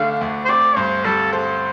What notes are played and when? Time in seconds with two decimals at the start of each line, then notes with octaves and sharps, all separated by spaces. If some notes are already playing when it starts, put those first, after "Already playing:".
Already playing: D2 D3 A3 D4 F5
0.21 D2
0.45 C5
0.49 C4 D5
0.77 G2 C5
1.05 G3 A4
1.33 A4 C5